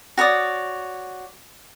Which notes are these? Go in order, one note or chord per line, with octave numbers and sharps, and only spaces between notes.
F#4 C#5 D5 D#6